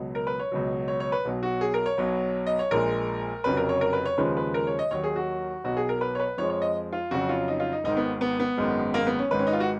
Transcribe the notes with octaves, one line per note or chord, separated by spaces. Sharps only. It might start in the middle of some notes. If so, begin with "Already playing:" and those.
Already playing: C#2 B2 F#3
A#4
B4
C#5
C#2 B2 F#3
C#5
C#5
B4
B1 B2 F#3
F#4
G#4
A#4
C#5
B1 B2 F#3
D#5
C#5
A#1 A#2 G#3 A#4
F1 F2 C#3 F#3 B4
A#4
C#5
A#4
B4
C#5
D#2 C#3 F3 G#3 B4
B4
A#4
C#5
D#5
D#2 D#3 F#3 C#5
G#4
F#4
B1 B2 F#3 F#4
G#4
A#4
B4
C#5
B4
F2 F3 G#3 C#5
C#5
D#5
F4
F2 C#3 F#3 F#4
F4
D#4
F4
D#4
G#1 G#2 D#3 D#4
B3
B3
B3
G#1 F#2 D#3 G#3
A#3
B3
C#4
G#1 G#2 D#3 B4
C#4
D#4
F4
F#4